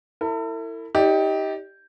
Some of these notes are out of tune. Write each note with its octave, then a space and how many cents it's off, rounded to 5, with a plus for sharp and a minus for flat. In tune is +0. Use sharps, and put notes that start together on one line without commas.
E4 +0 A4 +45
D#4 +30 G4 +0 D5 +0